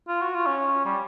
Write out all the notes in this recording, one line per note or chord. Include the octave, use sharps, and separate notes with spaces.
F4
F#4
F4
C#4
G3